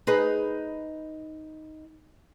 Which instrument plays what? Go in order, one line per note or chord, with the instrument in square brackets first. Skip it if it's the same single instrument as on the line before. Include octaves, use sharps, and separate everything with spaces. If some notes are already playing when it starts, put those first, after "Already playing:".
[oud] D#4 G#4 B4